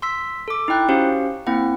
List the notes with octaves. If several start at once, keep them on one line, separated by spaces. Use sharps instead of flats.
C6 E6 B6
A4 D6
D#4 E4 G5 F#6
C#4 F#4 G4 C5 F5
A#3 C4 E4 F#5